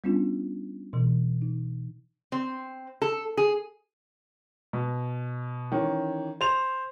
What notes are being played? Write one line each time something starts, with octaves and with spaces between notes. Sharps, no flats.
G3 B3 C#4 D4 F4
B2 E3
D#4
C4
A4
G#4
B2
D#3 E3 C#4
C5 F7